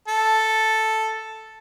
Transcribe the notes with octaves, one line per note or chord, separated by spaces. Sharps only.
A4